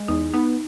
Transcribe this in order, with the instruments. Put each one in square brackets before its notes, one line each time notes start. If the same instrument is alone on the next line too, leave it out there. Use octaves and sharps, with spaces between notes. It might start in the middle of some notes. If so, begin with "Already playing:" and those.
Already playing: [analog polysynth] G#3
[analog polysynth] E2 [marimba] D#4
[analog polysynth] B3 [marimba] D#4